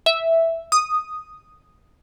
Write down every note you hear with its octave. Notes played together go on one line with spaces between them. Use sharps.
E5
D#6